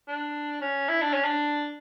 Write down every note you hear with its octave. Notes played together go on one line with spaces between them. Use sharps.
D4
C#4
E4
D4
C#4
D4